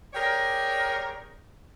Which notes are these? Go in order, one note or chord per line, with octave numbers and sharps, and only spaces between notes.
G4 G#4 A#4 C#5 D5